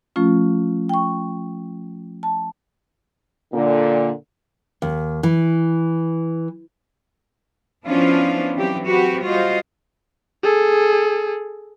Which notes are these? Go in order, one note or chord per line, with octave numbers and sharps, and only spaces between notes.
F3 A3 C#4 F4
G5 C#6
A5
A#2 D3
D#2
E3
F3 B3 C#4 D4 E4 F4
E3 F#3 C4 G4
C4 F#4 G4 B4
G3 F4 F#4 C5 D#5
G#4 A4